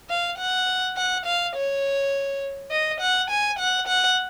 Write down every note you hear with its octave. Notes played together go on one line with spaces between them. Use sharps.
F5
F#5
F#5
F5
C#5
D#5
F#5
G#5
F#5
F#5